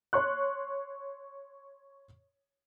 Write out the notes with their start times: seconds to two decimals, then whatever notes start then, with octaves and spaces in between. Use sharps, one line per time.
0.13 C#5 C6 C#6 F#6